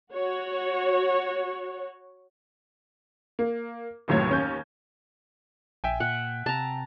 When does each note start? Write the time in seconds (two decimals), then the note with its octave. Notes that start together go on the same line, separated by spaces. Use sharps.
0.12 F#4 C#5
3.39 A#3
4.08 F1 D#2 A2 F#3 C#5 G#6
4.29 D#2 C#4 G6
5.84 A#1 E5 G5 G#5
6.00 A#2 F#5
6.46 C3 A5 A#5